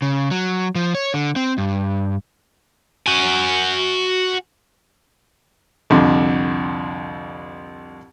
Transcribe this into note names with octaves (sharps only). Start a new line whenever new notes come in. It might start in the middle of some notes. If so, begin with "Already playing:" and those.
C#3
F#3
F3
C#5
D3
C4
G2
F#4 G#5
C2 F2 D3